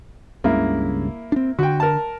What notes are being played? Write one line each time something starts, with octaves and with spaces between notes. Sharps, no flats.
C#2 G2 C#3 A#3 E4
C4 D4
D3 F#4 G5
A#4 A5